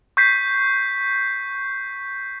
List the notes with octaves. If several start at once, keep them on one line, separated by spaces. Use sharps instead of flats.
C#6 G6 B6 C7